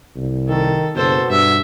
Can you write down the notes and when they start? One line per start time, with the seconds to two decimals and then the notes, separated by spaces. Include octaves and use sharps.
0.16 C2
0.48 D#3 A4
0.95 F#1 B2 A4 C5
1.30 G2 E5